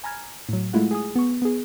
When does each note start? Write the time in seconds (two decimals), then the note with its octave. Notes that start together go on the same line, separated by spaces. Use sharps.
0.04 G#5 A#5 B5 F6 G#6
0.49 A2 F#3
0.73 G#3 A3 E4 F4 F#5
0.91 G#4 G#5 D#6
1.16 B3 C#6
1.42 B3 G#4